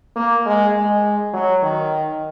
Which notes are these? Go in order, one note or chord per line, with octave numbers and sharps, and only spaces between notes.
A#3
G#3
G#3
F#3
D#3